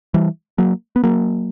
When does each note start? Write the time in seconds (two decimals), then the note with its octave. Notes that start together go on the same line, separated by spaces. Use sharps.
0.14 E3 G3
0.58 F#3 A#3
0.96 B3
1.03 F#3 A#3